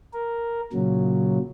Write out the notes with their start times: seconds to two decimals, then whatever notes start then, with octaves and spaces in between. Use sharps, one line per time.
0.13 A#4
0.73 A#2 C#3 F#3